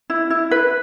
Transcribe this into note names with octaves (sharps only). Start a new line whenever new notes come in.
E4
E4
B4